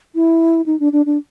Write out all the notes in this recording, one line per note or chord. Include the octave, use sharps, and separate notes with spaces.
E4
D#4
D4
D4
D4